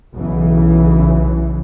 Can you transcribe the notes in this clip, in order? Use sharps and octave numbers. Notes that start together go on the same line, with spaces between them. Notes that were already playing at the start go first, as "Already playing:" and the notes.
B1 C#3 E3